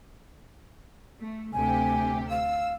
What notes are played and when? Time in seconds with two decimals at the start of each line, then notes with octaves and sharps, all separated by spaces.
1.20 A3
1.53 D2 C3 G4 G#5
2.30 F5 E6